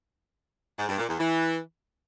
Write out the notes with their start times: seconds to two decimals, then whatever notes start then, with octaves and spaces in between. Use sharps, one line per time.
0.78 G#2
0.88 G2
0.98 A#2
1.08 E2
1.19 E3